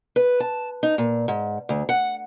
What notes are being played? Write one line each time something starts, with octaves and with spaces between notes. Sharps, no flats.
B4
A5
D#4
A#2
G#2
D2
F#5